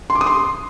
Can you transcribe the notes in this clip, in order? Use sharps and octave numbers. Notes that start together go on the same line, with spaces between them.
C6
D6
D#6
C6